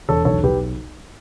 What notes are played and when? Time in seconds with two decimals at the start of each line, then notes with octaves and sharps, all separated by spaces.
0.08 E1 A4 C#5
0.25 B1 A4 C#5
0.43 B1 G4 B4